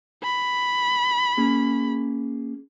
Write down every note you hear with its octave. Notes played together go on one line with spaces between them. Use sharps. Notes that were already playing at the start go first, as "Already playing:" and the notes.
B5
A#3 C#4 G#4